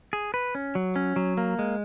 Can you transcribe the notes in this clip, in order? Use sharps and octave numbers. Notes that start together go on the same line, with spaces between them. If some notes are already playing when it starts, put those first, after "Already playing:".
G#4
B4
C#4
F#3
C#4
F#3
A#3
G#3